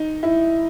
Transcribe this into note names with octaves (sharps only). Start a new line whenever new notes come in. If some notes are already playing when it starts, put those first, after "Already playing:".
Already playing: D#4
E4